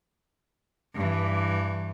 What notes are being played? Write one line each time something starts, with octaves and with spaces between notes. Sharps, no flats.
G2 E3